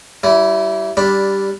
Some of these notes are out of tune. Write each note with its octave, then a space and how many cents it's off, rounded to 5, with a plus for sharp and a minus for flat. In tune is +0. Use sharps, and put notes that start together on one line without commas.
G3 -30 E4 +10
G3 +0 D4 -10 B5 +0